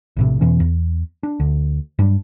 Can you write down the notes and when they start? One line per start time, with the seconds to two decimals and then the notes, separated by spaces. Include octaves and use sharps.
0.17 A#1 A2 C3
0.41 E2 B2 E3 C#4
0.60 E2
1.23 D4
1.40 D2
1.99 G2 F#3 G3 D4